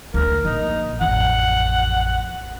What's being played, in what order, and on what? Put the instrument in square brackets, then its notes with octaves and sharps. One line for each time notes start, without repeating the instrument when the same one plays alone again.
[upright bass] D2 [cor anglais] A#4
[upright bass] A#1 [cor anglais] D#4
[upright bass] A1 F2 [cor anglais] F#5